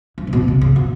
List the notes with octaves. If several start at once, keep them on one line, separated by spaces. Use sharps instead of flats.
G2
C#3
B2
C#3
C#3
B2